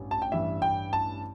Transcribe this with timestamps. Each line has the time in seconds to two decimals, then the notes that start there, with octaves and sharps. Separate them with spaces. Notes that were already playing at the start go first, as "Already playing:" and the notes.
Already playing: A1 G2
0.11 A5
0.22 G5
0.32 A1 G2 E3 E5
0.62 G5
0.93 A5